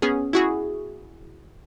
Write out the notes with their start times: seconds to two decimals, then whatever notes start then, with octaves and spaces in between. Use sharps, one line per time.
0.02 B3 C#4 G#4
0.33 E4 F#4 G#4